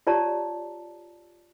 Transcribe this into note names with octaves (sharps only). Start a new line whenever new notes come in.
F4 G4 C#5 D5 A5 A#5